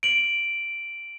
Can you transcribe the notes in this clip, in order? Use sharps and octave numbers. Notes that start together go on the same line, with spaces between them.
D7 F#7